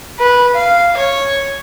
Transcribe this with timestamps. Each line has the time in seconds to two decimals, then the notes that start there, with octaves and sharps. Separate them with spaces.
0.19 B4
0.56 F5
0.97 C#5